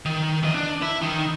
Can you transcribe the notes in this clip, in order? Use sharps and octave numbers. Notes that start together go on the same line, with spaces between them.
D#3
E3 D#5
D4
E4
D#3 D#4